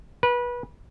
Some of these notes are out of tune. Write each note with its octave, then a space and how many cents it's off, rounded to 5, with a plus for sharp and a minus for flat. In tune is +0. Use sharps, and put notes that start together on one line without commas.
B4 -25